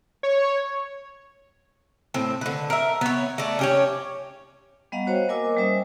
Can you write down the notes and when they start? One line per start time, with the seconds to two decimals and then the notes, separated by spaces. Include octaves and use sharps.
0.23 C#5
2.14 A2 C4
2.41 D3 B4
2.70 A#4 E5
3.01 B3 C#5
3.38 A3 D5
3.59 C#4 G4 C#5
4.92 G3 B3 D#5 F5 F#5 A#5
5.07 F#4 C5 C#5
5.28 A#3 A#4 D#5 G#5 D6 E6
5.57 G3 C#4 C5 E5 D#6